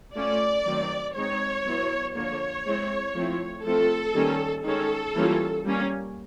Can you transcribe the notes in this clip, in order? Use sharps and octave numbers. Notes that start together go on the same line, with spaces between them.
A3 C#4 F4 D5
D#3 F#3 A3 C4
G#3 C4 D#4 C#5
F#3 B3 E4
D3 F3 A#3 C#5
G#3 C4 E4
F3 A3 C4 E4
F3 A3 C4 F4 A4
D#3 G3 A#3 C#4
D#3 G#3 C#4 A4
E3 G3 A#3 C#4 F4
G3 A#3 C#4